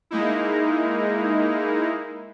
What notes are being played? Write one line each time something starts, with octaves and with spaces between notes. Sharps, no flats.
G#3 A#3 D#4 E4